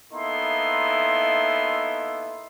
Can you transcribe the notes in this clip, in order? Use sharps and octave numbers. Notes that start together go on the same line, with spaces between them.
A#3 B3 D#4 E4 A4 C6